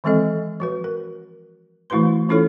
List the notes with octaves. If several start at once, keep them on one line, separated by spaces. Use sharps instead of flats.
D#3 E3 G#3 C4 A4 D#5
F3 F#4 B4
A#4
E3 A3 E4 F#4 B4 C6
E3 C#4 E4 F4 A4 C#5